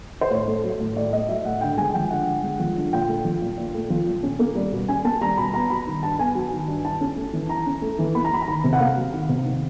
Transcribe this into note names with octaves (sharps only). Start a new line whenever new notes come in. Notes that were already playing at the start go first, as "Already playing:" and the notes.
C5
A2 C#5
A3
F#3
A2
A2 D5
A3 D#5
F#3 E5
A2 F#5
D3 G5
G#3 G#5
F3 G5
D3 F#5
D3
G#3
F3
D3
A#2 G5
A3
F3
A#2
A#2
A3
F3
A#2
C#4
A#3
G3
B2
C#4 G#5
A#3 A5
G3 A#5
B2 B5
B3 A#5
F#3 B5
D#3
G2 A5
B3 G#5
F#3
D#3
G2
E4 A5
C#4
A3
E3
E4 A#5
C#4
A3
E3
A#3 B5
A#5
F#3 B5
A#5
D#3 B5
C3
F#5
A#3 F5
F#3
D#3
C3
D#3